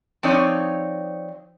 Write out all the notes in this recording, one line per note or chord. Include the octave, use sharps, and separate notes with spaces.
F3 C4 D#4 C#5 D5